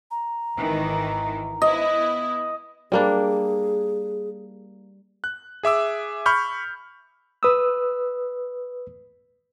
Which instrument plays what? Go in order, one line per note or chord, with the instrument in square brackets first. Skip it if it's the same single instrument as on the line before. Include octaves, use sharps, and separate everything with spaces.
[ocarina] A#5
[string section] G#1 D#3 E3
[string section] B3 E4 [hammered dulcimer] D#5
[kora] G3 A#3 D4 [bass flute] G#4
[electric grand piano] F#6
G#4 E5 D6 E6
B5 C#6 F6 G6
[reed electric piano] B4 D#6 E6